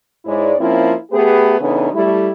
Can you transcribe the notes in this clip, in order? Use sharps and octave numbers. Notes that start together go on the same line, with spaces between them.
G#2 G#3 E4 C#5 D5
F3 A#3 C4 C#4 E4
A3 B3 G4 G#4 B4
C#3 E3 B3 D4 D#4 A4
G3 A3 E4